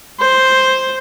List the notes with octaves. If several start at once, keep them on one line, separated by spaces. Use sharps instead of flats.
C5